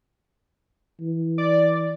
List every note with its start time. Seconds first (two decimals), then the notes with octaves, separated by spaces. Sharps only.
1.01 E3
1.38 D5